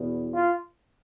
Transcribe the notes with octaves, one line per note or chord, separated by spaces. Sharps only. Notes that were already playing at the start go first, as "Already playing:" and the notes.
Already playing: E2 B2
F4